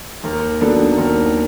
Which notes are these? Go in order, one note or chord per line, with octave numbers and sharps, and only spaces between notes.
D#2 A#4
D#3 F#3 B3 D4 A4
D#2 A#4